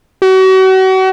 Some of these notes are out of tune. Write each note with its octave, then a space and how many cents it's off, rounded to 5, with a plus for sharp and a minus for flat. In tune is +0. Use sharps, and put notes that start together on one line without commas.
F#4 +35